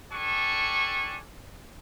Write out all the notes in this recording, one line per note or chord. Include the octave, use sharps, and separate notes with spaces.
D4 G4 A4 G#5 C#6